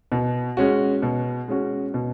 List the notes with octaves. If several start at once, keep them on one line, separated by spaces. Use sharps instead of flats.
B2
G#3 C#4 F#4
B2
G#3 C#4 F#4
B2